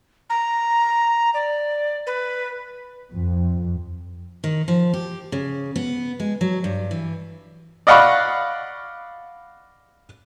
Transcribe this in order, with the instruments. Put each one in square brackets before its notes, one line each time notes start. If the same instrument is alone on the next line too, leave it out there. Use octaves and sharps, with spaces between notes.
[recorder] A#5
D5
B4
[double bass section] F2
[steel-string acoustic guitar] D#3
F3
G4
C#3
B3
G#3
F#3
G2
E3
[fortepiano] D5 D#5 F5 F#5 B5 C#6